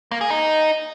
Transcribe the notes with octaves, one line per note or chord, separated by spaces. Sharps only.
A#3
G#4
D#4